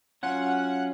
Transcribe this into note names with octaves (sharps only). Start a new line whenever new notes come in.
F#3 C#4 F4 F#5